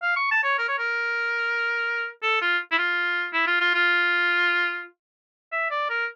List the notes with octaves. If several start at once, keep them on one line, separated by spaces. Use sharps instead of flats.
F5
C#6
A5
C#5
A#4
C#5
A#4
A4
F4
E4
F4
E4
F4
F4
F4
E5
D5
A#4